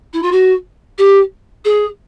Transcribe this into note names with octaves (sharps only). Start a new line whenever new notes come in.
E4
F4
F#4
G4
G#4